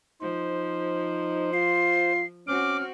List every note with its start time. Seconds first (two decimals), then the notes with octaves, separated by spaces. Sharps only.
0.22 F3 D#4 C5
1.53 F4 C7
2.48 C4 C#4 F#4 D6 F6